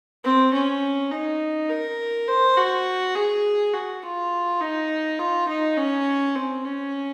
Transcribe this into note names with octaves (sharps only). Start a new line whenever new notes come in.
C4
C#4
D#4
A#4
C5
F#4
G#4
F#4
F4
D#4
F4
D#4
C#4
C4
C#4